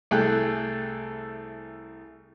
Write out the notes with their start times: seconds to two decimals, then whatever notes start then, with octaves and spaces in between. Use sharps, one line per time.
0.11 C2 A3 G#4 A4 G5 F#6